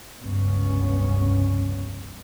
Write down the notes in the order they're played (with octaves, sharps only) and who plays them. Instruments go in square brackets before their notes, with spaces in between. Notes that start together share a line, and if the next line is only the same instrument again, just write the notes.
[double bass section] F1 C#2 G2 B3 C#4